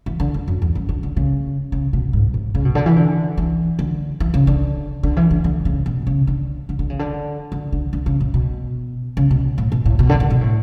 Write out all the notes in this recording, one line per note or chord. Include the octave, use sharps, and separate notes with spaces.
E3
D3
E2
F#2
E2
F#2
D3
D3
C#3
C#3
B2
G#2
A2
C#3
B2
D3
E3
D3
E3
D3
E3
C#3
D3
D3
E3
D3
D3
C#3
B2
C#3
D3
D3
D3
C#3
D3
D3
D3
D3
C#3
A2
B2
C#3
B2
A2
B2
A2
B2
D3
D3
B2
A2